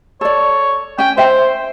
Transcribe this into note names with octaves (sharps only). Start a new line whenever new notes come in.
A4 C#5 D5
C#4 G5 G#5
C5 E5 G5